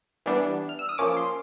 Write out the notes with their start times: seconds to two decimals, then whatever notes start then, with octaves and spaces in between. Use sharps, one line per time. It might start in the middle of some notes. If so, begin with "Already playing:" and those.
0.26 E3 G3 B3 D4
0.69 F6
0.79 E6
0.89 D#6
0.98 F3 A#3 C#4 D6
1.17 C6